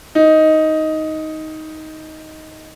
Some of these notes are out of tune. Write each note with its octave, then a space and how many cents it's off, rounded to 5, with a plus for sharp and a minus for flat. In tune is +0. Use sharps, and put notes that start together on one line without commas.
D#4 +10